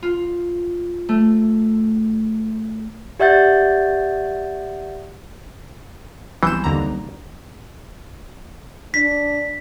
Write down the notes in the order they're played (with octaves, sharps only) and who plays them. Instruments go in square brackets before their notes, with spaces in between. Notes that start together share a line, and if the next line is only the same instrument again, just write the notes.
[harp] F4
A3
[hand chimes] G4 D5 E5 F#5 G6 A6
[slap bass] C2 F#3 B3 [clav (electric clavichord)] E3 [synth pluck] C6 G6 E7
[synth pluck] D#2 D3 A#5
[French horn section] D4 [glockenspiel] B6